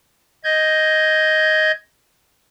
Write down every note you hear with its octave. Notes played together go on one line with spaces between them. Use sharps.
D#5 G6 G#6